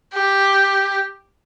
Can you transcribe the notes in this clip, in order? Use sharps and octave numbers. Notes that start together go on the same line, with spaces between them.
G4